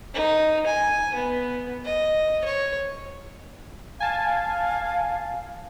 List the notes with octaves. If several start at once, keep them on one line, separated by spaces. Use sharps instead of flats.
D#4
G#5
B3
D#5
C#5
F5 G#5 A5